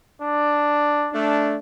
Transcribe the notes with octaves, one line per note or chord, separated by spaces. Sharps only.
D4
A3 D4